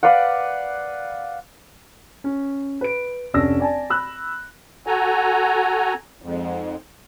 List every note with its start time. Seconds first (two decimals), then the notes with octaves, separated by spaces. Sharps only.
0.03 B4 D5 F5 F#5
2.24 C#4
2.81 B4 D7
3.34 F1 C#4 D4 E6 A#6
3.60 D5 G#5 A5
3.90 B5 E6 F#6
4.86 F#4 A4 G#5 A#5
6.22 F2 G#2